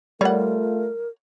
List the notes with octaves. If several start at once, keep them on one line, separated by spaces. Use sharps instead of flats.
G3 A3 F4 A#4 C#5 F#5